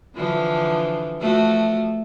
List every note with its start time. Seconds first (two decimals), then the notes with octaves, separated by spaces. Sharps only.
0.15 D3 E3 F3
1.21 F3 A3 F#4